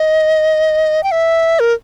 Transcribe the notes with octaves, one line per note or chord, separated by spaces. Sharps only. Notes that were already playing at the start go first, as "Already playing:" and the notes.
Already playing: D#5
G5
E5
A#4